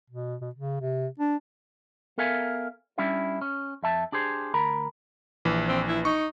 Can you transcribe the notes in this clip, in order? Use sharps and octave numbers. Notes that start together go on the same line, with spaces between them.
B2
B2
C#3
C3
D4
B3 A4 A#4 E5 F5 G#5
G3 C#4 D4 E4 G4 E5
C#4
F2 E5 A5
D4 G4 G#4 C5
D2 A#4 A#5 B5
A#1 E3
C4
E4
D#4 C#6